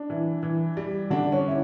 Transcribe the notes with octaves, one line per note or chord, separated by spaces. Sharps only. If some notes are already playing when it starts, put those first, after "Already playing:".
Already playing: D4
E3
E3
G3
D3 D4
C#4
E4